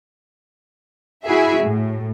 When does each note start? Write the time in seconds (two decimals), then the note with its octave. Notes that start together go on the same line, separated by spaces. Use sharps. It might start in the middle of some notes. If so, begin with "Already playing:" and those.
1.24 E4 F#4 G#4 E5
1.61 A2